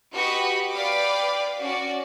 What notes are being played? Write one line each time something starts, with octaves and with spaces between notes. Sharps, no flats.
F#4 G4 B4 D#5 B5 C#6
B4 D5 F5 G5 B5 D6
C#4 F#4 D5